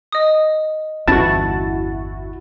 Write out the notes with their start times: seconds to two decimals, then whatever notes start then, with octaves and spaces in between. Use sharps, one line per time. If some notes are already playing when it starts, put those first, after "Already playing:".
0.12 D#5 D#6
1.08 G1 E2 C#4 E4 F#4 A5 A6